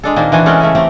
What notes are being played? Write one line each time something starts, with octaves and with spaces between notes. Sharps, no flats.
G#3 D4 A4
A#2 D#3 A#3 C4 D4
B2 E3 C4 D4 F#4 G#5
G#3 C#4 A4 A#4 F#5 G5
C#3 A3 E5 G#5
A3 C4 G4 A#5